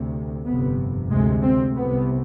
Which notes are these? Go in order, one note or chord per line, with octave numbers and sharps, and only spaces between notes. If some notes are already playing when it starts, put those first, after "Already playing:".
Already playing: D2 C3
G1 F2 C3 B3
D2 C3 G#3
C4
C2 C3 B3